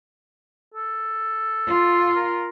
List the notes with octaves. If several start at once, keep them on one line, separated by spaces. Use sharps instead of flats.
A4
F4
A#4